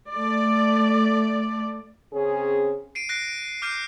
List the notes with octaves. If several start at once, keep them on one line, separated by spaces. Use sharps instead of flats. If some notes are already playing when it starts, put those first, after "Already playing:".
A3 D5
C#3 C4 C#4 G#4
C7 D7 D#7
F#6 A#6 C7 D7
D7
D6 F6 G6 C7 D#7